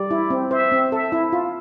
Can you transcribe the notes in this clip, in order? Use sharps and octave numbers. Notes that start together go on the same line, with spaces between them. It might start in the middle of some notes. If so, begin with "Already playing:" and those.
Already playing: G3 D5
E4
C4
C5 E5
C4
A4 E5
E4
F4